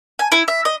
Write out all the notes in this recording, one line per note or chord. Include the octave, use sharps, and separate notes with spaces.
G#5
E4
E5
D#5